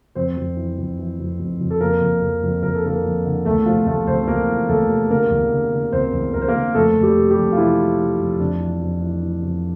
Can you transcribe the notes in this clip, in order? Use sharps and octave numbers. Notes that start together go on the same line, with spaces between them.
F2 C4 C5
F2
E3
F2
E3
F2
F2
F2
A4
F2 A#3 A#4
F2
F2
F2
F2 A#4
A4
D3 A#3 A#4
F2
D3
E2 A3 A4
C3 F3 F4
E2 A3 A4
E2 C4 C5
E2 A#3 A#4
E3
E2 A3 A4
C3
D3 A#3 A#4
E2
D3
D3
E2 C4 C5
E2
E2 A#4
C5
A#3 A#4
D3
F2 A3 A4
F2
G3 G4
C3
G3 G4
F2
F4
C3 E3 E4
E3
E3
F2
F2 D4
E3
F2
E3
E3
F2